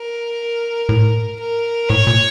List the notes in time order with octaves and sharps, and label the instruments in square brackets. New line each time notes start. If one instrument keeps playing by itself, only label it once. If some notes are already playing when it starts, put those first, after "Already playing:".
Already playing: [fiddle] A#4
[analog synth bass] A2
[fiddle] A#4
[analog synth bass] A2 [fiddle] C#5
[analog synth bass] A#2